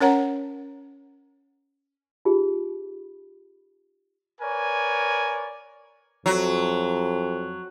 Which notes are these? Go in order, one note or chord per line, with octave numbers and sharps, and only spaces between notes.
C#4 A#4 C#5 F#5 A#5
D#4 F4 G4 G#4
A#4 B4 C#5 D5 G#5
F2 F#3